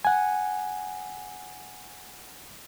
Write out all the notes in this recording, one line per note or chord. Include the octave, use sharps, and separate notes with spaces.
F#5 G#5